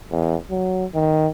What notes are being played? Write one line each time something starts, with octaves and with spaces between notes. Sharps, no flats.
E2
F#3
D#3